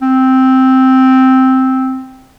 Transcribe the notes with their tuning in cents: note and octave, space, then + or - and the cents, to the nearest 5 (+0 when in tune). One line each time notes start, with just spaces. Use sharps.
C4 +0